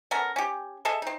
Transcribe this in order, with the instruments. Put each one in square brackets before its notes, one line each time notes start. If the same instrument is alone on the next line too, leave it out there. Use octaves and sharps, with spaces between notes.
[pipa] B3 C#4 A4 A#4
C#4 G4
G#4 A4 D#5 E5
C4 D#4